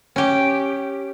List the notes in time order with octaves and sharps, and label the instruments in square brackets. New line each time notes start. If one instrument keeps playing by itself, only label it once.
[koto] C#4 G4